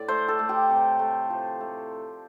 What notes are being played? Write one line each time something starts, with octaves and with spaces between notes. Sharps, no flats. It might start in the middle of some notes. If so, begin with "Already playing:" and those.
Already playing: A2 D5
A3 C5
A4
A3
G4
C3
A3
F3
A3